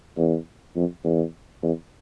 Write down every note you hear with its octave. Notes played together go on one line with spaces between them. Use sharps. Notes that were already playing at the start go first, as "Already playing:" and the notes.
E2
F2
E2
E2